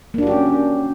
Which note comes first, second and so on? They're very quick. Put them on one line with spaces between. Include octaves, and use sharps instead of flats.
A#3 D4 F#4 G4 C#4